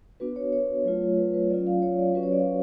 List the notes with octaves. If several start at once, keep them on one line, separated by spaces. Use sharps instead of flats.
B3 D4 F#4 B4
C#5
C#5
F#3 A3 F4
B4
B4
F#3 C#4 F4 D5
F5
C#5
D5
F#3 C#4 F#4 B4
C#5
D5
F5